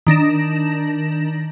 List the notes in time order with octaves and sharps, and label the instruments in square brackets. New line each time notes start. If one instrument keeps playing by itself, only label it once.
[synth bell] D#3 D4 A#6 E7